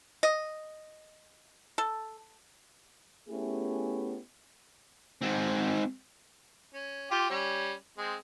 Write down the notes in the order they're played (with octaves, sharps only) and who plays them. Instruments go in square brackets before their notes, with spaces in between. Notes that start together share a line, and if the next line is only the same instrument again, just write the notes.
[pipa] D#5
A4
[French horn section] A3 B3 C#4 E4 G4 G#4
[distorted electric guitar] G#2 C4
[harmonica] C#4
F4 G4
G3 C#4
G#3 C4